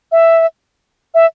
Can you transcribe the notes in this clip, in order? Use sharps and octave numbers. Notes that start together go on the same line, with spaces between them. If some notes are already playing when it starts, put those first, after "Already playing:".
E5
E5